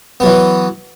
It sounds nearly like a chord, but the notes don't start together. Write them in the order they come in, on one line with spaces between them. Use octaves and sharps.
B3 F#3 E3